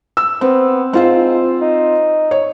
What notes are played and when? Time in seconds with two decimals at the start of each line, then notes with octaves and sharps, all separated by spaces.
0.17 E6
0.41 B3 C4
0.93 G#2 C4 F4 C5
1.62 D#4
2.31 C#5